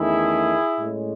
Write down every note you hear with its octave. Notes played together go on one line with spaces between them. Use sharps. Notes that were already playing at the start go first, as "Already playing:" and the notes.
Already playing: E2 D#3 A3 C#4 E4 G#4
A2 G#3 C#4